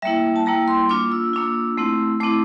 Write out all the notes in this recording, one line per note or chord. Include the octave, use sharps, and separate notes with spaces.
G3 A#3 E4 E5
A5
G3 A#3 E4 A#5
C6
A#3 D4 F4 D6
E6
A#3 D4 F4
A3 C4 E4
A3 C4 E4 D6